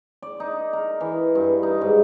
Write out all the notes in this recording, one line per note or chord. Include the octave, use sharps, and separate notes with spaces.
D5
D#4
A#4
E3
G2
D#4
G#2